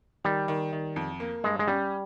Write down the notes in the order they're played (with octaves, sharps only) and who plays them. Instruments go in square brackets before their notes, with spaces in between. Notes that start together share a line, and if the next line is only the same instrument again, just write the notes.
[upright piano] D#3 [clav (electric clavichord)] G3
[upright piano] D#3
D#3
F2
A#3
[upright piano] G2 [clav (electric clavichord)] G#3
[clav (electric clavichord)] G#3
[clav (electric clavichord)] G3 [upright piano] C#4